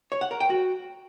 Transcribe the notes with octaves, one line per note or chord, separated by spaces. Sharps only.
C#5
F#5
A#4
G5
F#4